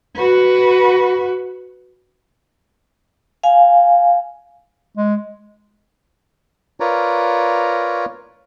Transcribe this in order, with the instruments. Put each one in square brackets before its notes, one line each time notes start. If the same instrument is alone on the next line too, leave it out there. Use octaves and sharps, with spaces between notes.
[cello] F#4 B4
[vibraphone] F5 G#5
[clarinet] G#3
[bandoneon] F4 A#4 B4 C#5 D5 A#5